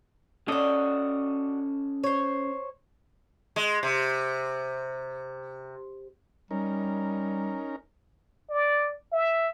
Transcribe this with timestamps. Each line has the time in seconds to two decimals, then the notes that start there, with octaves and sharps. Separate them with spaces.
0.48 C#4 D4 F#4 A4 D#5
2.04 C5 C#5
3.56 G#3
3.83 C3
6.51 G3 C#4 D#4 A#4
8.50 D5
9.13 E5